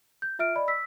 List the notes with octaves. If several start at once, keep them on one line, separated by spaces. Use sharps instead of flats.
G6
F4 E5 F6 D7
D5 D#5 B5
E6 B6